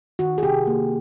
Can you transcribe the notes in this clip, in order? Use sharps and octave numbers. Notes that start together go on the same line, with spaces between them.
D#3 F#4
G#4
C3 G4
A#3